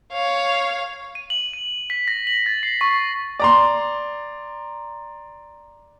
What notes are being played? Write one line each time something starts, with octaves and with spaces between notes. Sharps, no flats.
C#5 F5
D#7
F#7
D#7
B6
A#6
F#7
A6
C7
C#6
D5 A#5 C6